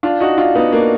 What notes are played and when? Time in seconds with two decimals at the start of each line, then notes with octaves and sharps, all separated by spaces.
0.03 D4 F4
0.20 D#4 F#4
0.38 D4 F4
0.55 B3 D#4
0.72 A#3 D4